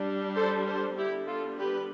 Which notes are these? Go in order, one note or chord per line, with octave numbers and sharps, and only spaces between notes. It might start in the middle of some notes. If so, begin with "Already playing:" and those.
Already playing: G3 D4
A4 C5
A4 C5
D3 G3 B3 E4 G4
F4 A4
G4 B4